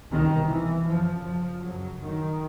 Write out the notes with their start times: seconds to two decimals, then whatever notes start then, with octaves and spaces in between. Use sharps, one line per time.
0.11 C2 B2 D#3
0.49 E3
0.86 F#2 C#3 F3
1.25 F3
1.63 F#2 C#3 F#3
2.01 D#3